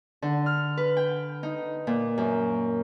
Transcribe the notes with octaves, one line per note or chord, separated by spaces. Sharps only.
D3
F6
B4
G5
D#4
A#2
F#2